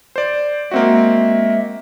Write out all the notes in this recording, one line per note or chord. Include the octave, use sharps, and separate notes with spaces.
C5 D5
G#3 A#3 C4 F#4 E5